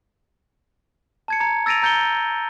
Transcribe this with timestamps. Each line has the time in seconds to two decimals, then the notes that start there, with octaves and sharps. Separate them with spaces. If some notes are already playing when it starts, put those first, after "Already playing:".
1.28 A5 G#6 C#7
1.40 A#5 G#6 C#7
1.66 E6 A6 A#6 D7 D#7 F7
1.83 A#5 G6 A6 C#7 G7